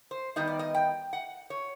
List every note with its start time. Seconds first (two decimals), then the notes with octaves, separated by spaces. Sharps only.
0.11 C5
0.36 D#3 G3 B3 D#4 D#5
0.47 D5
0.59 D#5
0.74 G5
1.13 F#5
1.50 C#5